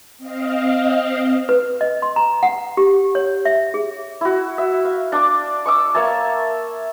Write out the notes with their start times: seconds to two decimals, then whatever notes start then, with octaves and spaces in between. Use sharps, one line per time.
0.18 C4 D#5 F5
1.49 B4
1.81 D#5
2.02 C6
2.16 A#5
2.43 F#5
2.77 G4
3.15 C#5
3.45 E5
3.74 G#4
4.21 E4 F#4
4.58 E5
4.85 F5
5.12 D4 D6
5.65 C#6 D6 E6
5.95 A#3 C#5 E5 A5